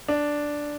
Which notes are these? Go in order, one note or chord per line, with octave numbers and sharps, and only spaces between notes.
D4